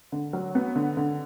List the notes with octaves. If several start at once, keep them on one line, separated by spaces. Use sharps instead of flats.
D3
F#3
B3
D3
D3